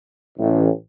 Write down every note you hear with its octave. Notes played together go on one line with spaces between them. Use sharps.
A1